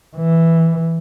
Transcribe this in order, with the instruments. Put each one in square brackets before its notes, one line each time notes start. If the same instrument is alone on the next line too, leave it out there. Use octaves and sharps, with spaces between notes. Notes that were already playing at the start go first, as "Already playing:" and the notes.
[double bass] E3